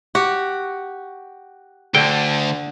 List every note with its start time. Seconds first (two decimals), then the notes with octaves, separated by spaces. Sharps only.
0.15 F#4 G4
1.95 D2 D3 G5